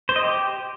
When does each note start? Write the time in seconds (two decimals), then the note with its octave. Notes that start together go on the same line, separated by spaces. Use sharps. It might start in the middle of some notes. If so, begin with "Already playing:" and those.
0.09 C5
0.16 D#5
0.23 G4